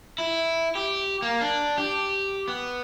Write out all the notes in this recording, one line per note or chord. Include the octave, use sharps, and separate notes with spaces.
E4
G4
A#3
D4
G4
B3